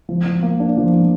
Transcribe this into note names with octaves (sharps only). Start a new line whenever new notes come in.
F3
F3
A#3
D4
F3
F3